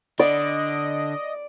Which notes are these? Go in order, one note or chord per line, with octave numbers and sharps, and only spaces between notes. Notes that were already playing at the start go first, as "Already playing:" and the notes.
D3 D5 D#5